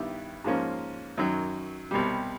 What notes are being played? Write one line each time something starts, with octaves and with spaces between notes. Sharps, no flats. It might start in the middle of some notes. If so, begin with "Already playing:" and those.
Already playing: G2 D#3 G3 B3 E4
G#2 F3 A#3 C#4
F#2 D#3 F#3
C2 B2 G3